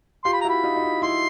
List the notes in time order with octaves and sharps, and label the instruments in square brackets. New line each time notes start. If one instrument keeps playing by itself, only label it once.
[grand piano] F4 G4 [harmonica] C6
[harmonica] B5
A#5
[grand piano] E4 F#4 [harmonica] B5
[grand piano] D#4 F4
D#4
E4
[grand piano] E4 [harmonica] C6